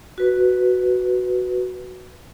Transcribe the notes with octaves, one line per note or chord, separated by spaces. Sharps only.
F#4 B4